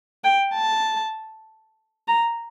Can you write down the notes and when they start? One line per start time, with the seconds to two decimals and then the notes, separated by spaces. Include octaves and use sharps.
0.24 G5
0.55 A5
2.08 A#5